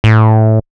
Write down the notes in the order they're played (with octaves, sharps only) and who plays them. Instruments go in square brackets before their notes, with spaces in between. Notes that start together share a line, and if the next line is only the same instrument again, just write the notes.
[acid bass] A2